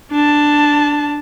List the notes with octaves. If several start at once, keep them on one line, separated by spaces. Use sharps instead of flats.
D4 A5